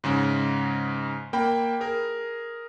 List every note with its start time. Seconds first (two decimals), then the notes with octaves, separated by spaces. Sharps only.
0.04 G#2 C#3 G#3
1.33 A#3 G5 B5
1.80 G#4 A#4